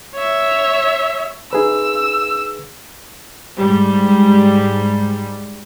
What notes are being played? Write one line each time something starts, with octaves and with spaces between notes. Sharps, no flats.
C#5 E5
D#4 G#4 B4 E6
G#2 G3